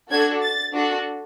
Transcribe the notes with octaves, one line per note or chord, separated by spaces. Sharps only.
D4 F#4 A4 G#6
A6
D4 F#4 A4